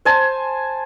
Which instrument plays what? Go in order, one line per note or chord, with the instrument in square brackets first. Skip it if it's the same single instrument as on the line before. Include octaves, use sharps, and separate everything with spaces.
[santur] C5 G#5 A5